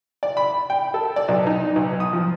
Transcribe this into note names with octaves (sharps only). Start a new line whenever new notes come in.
D5
B5
G5
A4
D5
B1
D#4
B1
D#6
F3